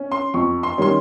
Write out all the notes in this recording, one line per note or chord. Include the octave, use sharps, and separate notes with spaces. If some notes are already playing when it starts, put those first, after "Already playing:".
Already playing: C#4
C6
F2 C#6
C6
D#3 G3 C#4 C6